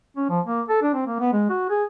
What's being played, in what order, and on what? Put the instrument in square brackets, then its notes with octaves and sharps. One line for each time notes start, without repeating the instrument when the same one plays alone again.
[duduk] C#4
F3
A#3
A4
D4
C4
A#3
B3
G#3
F#4
G#4